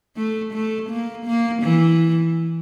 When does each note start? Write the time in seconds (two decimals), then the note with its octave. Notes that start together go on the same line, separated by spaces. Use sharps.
0.17 A3
0.53 A3
0.89 A#3
1.25 A#3
1.62 E3